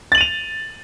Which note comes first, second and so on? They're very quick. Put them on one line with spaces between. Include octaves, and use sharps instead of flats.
A6 F#7 D#7 F7